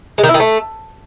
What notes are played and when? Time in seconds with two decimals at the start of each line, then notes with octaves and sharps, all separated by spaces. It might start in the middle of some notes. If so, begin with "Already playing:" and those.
0.18 G#3
0.24 D#3
0.29 E4
0.34 D#3
0.40 A3